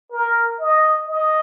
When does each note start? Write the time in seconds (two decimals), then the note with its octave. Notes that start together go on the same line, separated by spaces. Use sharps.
0.12 A#4
0.60 D#5
1.09 D#5